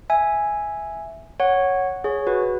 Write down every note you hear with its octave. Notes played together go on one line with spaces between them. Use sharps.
E5 G#5
C#5 F#5
G#4 C#5
F#4 B4